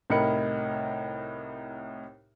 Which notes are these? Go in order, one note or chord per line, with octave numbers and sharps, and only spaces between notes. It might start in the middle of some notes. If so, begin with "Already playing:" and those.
C2 A2 D#4 A#4 B5 C#7